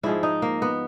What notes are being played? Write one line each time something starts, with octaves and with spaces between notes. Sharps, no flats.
G#2 F3 G#3 E4
D#4
A#3
B3